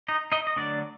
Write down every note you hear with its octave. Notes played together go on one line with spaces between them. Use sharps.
D#4 D#5
D#4 D#5
D#5
D3 F#3 A3 D4 D5